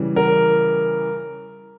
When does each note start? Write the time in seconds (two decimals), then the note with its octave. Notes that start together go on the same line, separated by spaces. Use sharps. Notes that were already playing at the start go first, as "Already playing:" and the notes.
Already playing: C#3 E3 G3
0.16 A#4